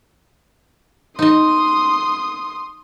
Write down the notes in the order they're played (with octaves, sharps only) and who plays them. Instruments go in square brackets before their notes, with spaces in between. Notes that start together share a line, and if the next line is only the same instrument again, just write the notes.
[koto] D#4 D#5 [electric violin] C6 D#6